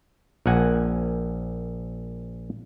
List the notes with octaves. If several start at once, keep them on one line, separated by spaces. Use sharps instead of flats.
A#1 F3 A#3 F#5 G#5